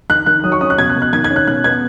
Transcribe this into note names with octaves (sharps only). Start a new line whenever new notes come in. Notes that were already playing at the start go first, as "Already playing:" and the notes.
D#3 F#6
D#3 F#6
F#3 D#6
C#6
C#4 D#6
F#6
B2 G#6
F#6
B2
F#6
D#3 G#6
G#6
C#4
F#6
B2 F#6
B3 G#6